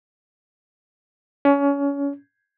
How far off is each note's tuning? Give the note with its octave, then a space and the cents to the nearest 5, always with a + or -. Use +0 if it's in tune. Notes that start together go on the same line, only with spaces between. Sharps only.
C#4 +25